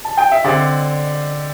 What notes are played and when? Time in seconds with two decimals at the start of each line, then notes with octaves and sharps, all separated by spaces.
0.04 A5
0.17 G5
0.31 E5
0.44 D3 C4 D5